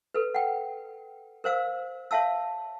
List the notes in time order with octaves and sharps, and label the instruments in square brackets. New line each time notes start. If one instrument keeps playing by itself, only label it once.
[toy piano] A4 B4
F#5 G5
A#4 C5 F5 E6
C#5 E5 F5 A5 E6